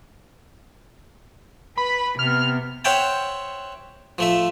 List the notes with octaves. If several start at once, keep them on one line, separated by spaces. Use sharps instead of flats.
B4 B5
C3 B3 F6
C5 C#5 E5 F#5 G5 A5
F3 A3 E5